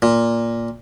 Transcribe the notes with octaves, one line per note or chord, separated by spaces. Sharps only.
A#2